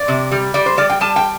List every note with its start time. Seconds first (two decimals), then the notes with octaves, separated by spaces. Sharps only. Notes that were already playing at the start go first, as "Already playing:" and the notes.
Already playing: D5
0.08 C3
0.31 G3
0.54 G3 D5
0.66 C5
0.77 G3 D5
0.90 G5
1.01 G3 A5
1.16 G5